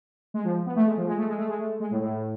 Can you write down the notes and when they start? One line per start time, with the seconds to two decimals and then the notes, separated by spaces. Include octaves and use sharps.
0.34 G#3
0.45 F3
0.66 B3
0.76 A3
0.86 G#3
0.97 F3
1.07 G#3
1.18 A3
1.28 G#3
1.38 A3
1.49 G#3
1.59 A3
1.80 G#3
1.91 A2
2.01 A2